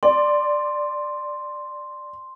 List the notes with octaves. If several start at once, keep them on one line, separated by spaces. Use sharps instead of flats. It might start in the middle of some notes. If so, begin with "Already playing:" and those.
D5 C6